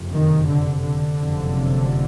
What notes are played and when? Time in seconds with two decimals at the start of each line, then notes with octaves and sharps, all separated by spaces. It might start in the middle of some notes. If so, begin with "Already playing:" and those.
Already playing: F#1 F2 C3
0.11 D#3
0.47 D3
0.83 D3
1.20 F#1 F2 C3